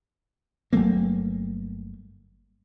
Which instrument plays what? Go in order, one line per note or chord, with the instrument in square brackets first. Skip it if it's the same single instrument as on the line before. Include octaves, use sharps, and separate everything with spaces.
[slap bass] G1 F#3 A3 A#3